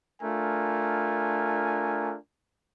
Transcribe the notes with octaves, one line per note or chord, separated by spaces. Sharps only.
A3 D4 F4 A#4 G#5